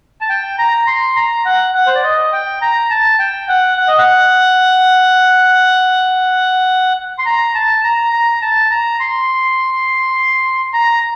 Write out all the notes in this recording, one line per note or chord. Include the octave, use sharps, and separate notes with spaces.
A5
G5
A#5
C6
A#5
F#5
F#5
C5
D5
D#5
G5
A#5
A5
G5
F#5
F#5
D#5
F#5
C6
A#5
A5
A#5
A#5
A5
A#5
C6
A#5